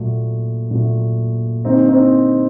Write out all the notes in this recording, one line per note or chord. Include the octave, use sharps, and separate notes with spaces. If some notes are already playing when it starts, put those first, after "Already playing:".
Already playing: A#2 F#3 A3
A#2 F#3 A3
D3 G3 A#3 C4 D#4
C4 D#4